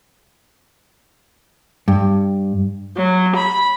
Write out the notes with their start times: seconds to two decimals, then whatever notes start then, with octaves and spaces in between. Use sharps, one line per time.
1.88 G2
2.97 F#3
3.35 B5